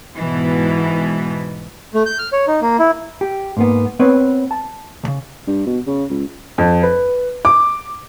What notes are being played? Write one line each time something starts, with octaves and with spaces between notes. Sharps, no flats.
G#2 B2 E3
A3
G6
F6
C#5
D#4
A#3
E4
G4
G#2 A#3 B3
B3 C4 B4 C#5
A5
D2 C#3
G2
B2
C#3
C#2
F2
B4
D6